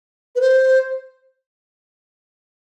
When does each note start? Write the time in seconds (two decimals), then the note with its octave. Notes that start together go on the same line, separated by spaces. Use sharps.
0.36 B4
0.41 C5